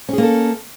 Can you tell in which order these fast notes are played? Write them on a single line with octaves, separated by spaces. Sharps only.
C#4 G#4 A#3 A4